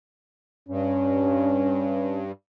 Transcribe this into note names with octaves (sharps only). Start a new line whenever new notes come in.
G2 C#4